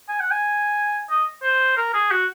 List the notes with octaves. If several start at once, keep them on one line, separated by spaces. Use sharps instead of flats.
G#5
F#5
G#5
D#5
C5
A#4
G#4
F#4